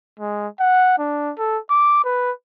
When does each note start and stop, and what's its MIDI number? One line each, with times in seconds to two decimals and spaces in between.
0.20 0.48 56
0.60 0.97 78
0.99 1.32 62
1.38 1.58 69
1.71 2.04 86
2.05 2.31 71